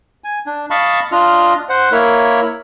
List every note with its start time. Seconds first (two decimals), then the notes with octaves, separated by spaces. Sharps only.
0.24 G#5
0.46 D4
0.71 D#5 F5 A5 B5 C#6
1.12 D4 F4 D#5 F6
1.69 C5 F#5
1.92 A#3 E4 A#4 C#5 B5